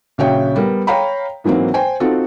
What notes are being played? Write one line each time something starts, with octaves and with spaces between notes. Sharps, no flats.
A#1 C#3 F#4 C#5 E5 G5
G3 B3 A#4
C#5 F5 G5 A#5 B5
G#2 E3 F#3 A#3 C4
C5 G5 G#5
C4 D#4 F4 F#4 A4